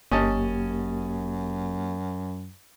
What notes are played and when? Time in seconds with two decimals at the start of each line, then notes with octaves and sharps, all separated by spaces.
0.12 G1 F#2 A#3 C#4 G4 D#5 A5